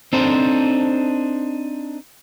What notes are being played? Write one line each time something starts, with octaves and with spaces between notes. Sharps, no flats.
C4 D4 D#4 A4 C5